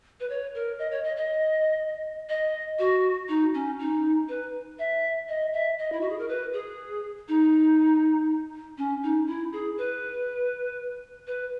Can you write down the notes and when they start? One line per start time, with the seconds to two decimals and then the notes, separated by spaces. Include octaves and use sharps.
0.20 B4
0.30 C#5
0.54 A#4
0.79 D#5
0.91 C#5
1.04 D#5
1.16 D#5
2.29 D#5
2.79 F#4
3.29 D#4
3.54 C#4
3.79 D#4
4.29 B4
4.79 E5
5.29 D#5
5.53 E5
5.78 D#5
5.92 E4
6.01 F#4
6.10 G#4
6.19 A#4
6.28 B4
6.54 G#4
7.28 D#4
8.78 C#4
9.03 D#4
9.27 E4
9.53 G#4
9.78 B4
11.27 B4